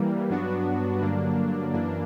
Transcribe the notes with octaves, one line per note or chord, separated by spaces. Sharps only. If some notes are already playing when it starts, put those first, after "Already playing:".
Already playing: E3 G3 A#3
G2 F#3 B3 D4 F#4
G2 D3 F#3 A#3 D4
F#2 E3 A#3 D4